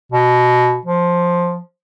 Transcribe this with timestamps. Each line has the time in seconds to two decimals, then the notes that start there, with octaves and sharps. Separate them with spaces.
0.12 B2
0.85 F3